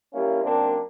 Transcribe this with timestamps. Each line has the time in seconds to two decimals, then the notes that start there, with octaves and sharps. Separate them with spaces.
0.14 G3 A#3 C#4 E4 F4
0.44 F#2 A#3 C4 D4